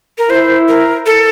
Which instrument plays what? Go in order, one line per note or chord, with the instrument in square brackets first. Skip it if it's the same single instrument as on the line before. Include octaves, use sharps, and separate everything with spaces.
[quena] A#4
[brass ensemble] E4 [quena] C5
[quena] A#4
A4